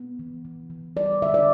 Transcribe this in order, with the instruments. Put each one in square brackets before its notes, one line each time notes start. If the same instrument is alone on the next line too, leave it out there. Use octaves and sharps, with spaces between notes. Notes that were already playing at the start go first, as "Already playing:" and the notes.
Already playing: [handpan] B3
E3
E3
E3
G3 D5
D3 E5
D5